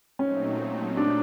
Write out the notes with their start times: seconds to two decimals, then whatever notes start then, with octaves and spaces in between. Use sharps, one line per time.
0.19 A#2 F#3 A3 C4 C#4 D#4
0.97 D4